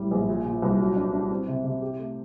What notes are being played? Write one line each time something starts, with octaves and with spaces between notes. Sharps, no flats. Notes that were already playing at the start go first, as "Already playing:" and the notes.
Already playing: A2 G3
A#1
A#2
A#2
C2
F#3
D4
D4
C4
C3
C3
G4
A3